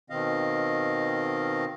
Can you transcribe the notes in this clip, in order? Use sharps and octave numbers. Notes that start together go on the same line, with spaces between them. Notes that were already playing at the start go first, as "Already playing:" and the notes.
B2 D#3 C4 D#5 F5